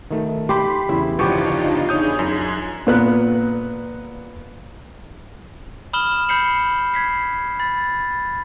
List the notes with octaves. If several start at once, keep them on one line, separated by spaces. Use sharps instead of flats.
D#3 A3
G4 B5 C6
E2 C#3 E4
G1 F3 B3 D4 D#4 F4 G4 C#6
G#4 C#5 B5 D#6 G6
F#2 C6 F#6 G#6
A#2 B3 F#6
B5 D#6 F6 E7 G7
B5 G6 C7 C#7 F#7
G#6 B6 C7
B5 A6